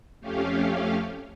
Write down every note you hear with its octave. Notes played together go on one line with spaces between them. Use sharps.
F2 A3 C#4 G4 F5